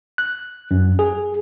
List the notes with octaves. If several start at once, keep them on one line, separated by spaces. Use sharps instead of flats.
F#6
F#2
G#4